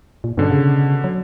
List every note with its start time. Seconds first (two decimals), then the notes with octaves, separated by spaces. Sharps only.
0.24 A#2
0.37 G2 B2 D3 C#4
0.51 C#3
1.04 F#3